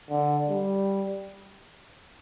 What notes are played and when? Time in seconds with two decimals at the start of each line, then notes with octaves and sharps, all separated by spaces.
0.10 D3
0.49 G3